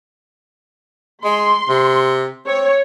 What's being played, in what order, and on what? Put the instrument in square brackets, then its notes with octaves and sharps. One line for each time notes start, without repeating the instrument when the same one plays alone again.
[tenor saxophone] G#3 [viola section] C6
[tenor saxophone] C3
[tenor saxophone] C4 [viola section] C#5